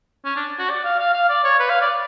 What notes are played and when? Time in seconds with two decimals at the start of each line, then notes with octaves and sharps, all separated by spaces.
0.25 C#4
0.36 D4
0.59 F#4
0.70 D5
0.85 F5
0.99 F5
1.14 F5
1.29 D5
1.44 C#5
1.59 B4
1.70 F5
1.82 D5